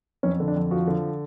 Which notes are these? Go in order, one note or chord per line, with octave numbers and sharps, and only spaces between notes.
F2 C#4
D3
D4
F2
F3 F#4
D3